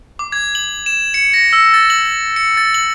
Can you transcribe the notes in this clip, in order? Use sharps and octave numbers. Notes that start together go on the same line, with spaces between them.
D6
G#6
F#7
E7
C#7
A#6
E6
A6
F#7
C#7
A6
F#7